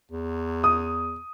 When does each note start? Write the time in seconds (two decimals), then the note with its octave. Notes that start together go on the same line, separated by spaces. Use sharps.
0.12 E2
0.64 D#6